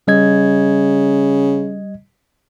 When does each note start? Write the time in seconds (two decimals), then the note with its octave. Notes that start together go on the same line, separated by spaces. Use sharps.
0.08 C#3 G3 D#5 G#6